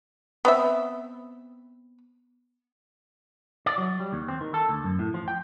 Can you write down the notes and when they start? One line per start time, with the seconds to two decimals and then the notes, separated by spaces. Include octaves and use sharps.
0.45 B3 C4 E5
3.66 D5
3.78 F#3
4.00 G3
4.13 D#2
4.28 C4
4.41 D#3
4.54 A4
4.69 D2
4.84 F#2
4.99 A2
5.14 F3
5.28 G5